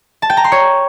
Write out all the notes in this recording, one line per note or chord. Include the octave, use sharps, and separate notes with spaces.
A5
G5
A#5
C6
C#5